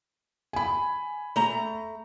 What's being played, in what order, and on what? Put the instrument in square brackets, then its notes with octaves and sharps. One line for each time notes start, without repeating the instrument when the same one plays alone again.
[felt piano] G#5 B5
[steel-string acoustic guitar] A3 A#5